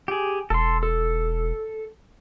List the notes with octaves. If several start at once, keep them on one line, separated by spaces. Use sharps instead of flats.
G4 G#4
E1 A4 C6
A4